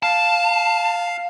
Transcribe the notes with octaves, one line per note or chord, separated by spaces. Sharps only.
F5 A5